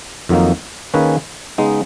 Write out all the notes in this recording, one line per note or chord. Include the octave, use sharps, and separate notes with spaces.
F2 D#3 F#3 A#3 D#4
D#3 A#3 C#4 G#4 B4
C#3 G#3 B3 D#4